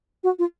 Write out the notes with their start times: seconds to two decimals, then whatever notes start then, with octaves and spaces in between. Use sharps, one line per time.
0.23 F#4
0.39 F4